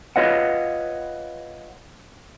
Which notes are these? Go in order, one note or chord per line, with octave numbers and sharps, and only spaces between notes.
F4 B4 C#5 D#5 F5 F#5